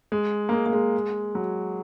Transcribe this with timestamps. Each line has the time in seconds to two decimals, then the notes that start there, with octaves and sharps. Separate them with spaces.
0.12 G#3
0.49 A#3
0.53 G#3
0.66 A#3
0.73 G#3
1.35 F#3